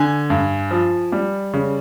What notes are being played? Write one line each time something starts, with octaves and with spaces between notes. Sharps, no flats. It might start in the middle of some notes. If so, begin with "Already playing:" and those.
Already playing: D3 G#5 G#6
G2
F3
G3
C#3